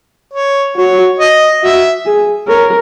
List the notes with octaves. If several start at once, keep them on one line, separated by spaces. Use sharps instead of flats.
C#5
F#4 C#5
D#5
F#4 E5
G#4
A#4 C#5